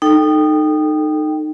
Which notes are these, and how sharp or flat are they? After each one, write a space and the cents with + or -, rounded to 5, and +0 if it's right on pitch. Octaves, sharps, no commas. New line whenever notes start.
D#4 -20 A4 +0 G5 +0